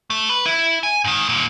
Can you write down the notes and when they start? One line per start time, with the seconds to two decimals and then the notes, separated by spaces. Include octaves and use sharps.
0.10 A3
0.29 B4
0.46 E4
0.83 G#5
1.04 G#2 D#3
1.29 D#2 A#2